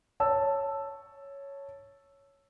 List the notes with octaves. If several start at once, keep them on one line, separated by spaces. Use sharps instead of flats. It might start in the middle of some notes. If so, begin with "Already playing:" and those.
C#5 A5 E6